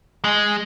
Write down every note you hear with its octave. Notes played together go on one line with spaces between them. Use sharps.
G#3